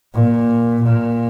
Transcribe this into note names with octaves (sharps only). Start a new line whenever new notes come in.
A#2
A#2